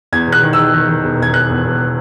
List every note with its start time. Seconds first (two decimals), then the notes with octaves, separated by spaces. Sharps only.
0.12 E2 G#6
0.27 E1
0.32 F#6
0.43 D#3
0.53 E6
0.58 D#3
0.74 D#3
0.88 D#3
1.04 E1
1.18 E1 G#6
1.34 E1 F#6
1.49 E2
1.64 E1